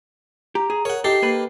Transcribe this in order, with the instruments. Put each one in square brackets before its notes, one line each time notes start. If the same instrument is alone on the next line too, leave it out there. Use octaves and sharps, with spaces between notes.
[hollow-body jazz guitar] G4 [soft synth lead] A#5
[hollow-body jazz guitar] G#4
[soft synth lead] A#4 [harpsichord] C#5 F#5
[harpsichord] D#4 G4 [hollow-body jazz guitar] A4 [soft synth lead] C7
[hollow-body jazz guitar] A#3 A4 B4